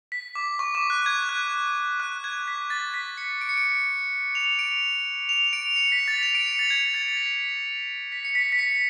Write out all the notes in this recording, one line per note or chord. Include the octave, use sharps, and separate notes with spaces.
B6
D6
C#6
D6
F#6
G#6
F#6
F#6
G#6
B6
A6
B6
C#7
D7
C#7
D7
F7
D7
F7
D7
C#7
B6
A6
F7
D7
C#7
A6
G#6
A6
A6
B6
B6
C#7
B6
B6
C#7